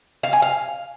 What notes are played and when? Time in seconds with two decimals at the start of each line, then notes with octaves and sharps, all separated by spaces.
0.23 F5
0.33 G#5
0.42 F5